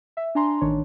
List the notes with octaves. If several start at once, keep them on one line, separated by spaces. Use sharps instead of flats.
E5
D4 G#5 A#5 C6
A1 D#3 D4 C#5